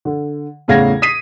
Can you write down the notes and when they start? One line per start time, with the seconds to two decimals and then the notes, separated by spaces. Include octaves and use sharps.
0.05 D3
0.68 E2 A2 C#3 F5 G#6 A#6
1.02 D#6 B6 C7 D#7